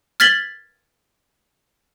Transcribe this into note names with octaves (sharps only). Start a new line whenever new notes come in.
F6 G#6 A6 B6 F#7 G7